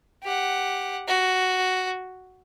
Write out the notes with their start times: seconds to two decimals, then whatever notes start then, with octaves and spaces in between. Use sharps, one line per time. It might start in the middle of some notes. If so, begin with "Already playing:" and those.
0.23 G4 F#5
1.08 F#4